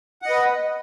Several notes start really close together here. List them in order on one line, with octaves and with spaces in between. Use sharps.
F#5 D#5 B4